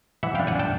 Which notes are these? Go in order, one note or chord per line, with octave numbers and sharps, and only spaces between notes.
E3 E5 F#5
D4 F5 G5
F#5 G#5
D4 G5 A5